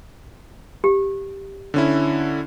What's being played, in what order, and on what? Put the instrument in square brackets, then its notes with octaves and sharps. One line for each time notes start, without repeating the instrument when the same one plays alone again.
[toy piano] G4
[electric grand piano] D3 C#4 E4